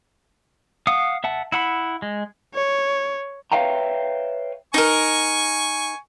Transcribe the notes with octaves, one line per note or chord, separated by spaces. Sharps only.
F5 F#5 D#6
E5 F#5 A5
E4 F#5 B5
G#3
C#5
B4 C#5 E5 F5 G5 A#5
D#4 G#4 A#4 G#5 C#6